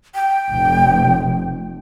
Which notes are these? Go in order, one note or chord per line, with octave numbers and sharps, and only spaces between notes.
G5
F1